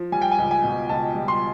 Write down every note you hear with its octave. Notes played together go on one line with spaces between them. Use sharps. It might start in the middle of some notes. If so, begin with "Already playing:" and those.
Already playing: F3
G3 G#5
G5
G#5
C#2
G#5
B2
C#2 A5
G3
C6